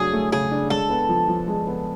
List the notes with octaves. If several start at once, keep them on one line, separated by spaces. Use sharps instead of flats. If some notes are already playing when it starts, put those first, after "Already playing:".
Already playing: C#3 F#3 A3 D4 G#4
A3
C#3 G#4
D4
G#3 A4
B3
F3
F3
G#3
B3